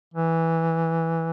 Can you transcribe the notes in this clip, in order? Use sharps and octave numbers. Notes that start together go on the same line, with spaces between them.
E3